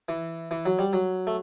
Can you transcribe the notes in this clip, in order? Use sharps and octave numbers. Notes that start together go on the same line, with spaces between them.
E3
E3
F#3
G3
F#3
A3